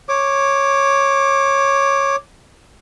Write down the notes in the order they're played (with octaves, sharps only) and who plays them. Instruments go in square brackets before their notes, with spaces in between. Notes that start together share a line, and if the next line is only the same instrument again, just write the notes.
[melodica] C#5 D6